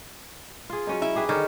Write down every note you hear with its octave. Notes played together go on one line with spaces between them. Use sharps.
F4 G#4
F#3 C#4 D#4
E4
G4 G#4 B4
D3 D#3 C#5